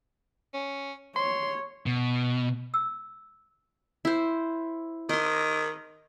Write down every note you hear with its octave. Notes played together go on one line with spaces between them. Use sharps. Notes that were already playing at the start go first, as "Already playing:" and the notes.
C#4
C#5 C6
B2
E6
E4 C5
D#3 D#5 C6